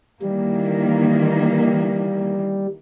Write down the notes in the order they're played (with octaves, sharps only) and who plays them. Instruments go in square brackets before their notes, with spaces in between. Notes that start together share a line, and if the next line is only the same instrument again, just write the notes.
[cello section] D#3 E3 A#3 [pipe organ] G3